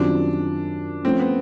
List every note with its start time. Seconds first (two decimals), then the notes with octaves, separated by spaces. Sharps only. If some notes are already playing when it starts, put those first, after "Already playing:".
Already playing: F#2 D#3 G3 C4 D4 F4
1.04 F3 A3 C4 C#4
1.19 B3